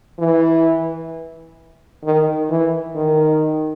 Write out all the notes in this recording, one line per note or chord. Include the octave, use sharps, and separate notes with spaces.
E3
D#3
E3
D#3